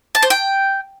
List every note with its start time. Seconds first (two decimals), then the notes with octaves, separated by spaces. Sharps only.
0.15 A5
0.23 C5
0.30 G5